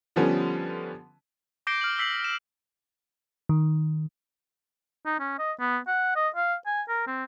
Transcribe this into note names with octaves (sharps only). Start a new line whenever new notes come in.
D3 F3 G3 B3 C#4
D6 G6 A#6 C7 D7 G7
F6 F#7
E6 B6 C7 F#7
E7
D#3
D#4
C#4
D#5
B3
F#5
D#5
F5
G#5
A#4
C4